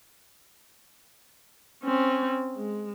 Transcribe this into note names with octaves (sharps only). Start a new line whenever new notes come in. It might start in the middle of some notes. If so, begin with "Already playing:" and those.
C4 C#4
G#3